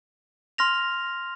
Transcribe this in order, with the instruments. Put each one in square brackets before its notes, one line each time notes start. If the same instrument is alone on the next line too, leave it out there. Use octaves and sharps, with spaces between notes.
[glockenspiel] C6 F6 A#6 F7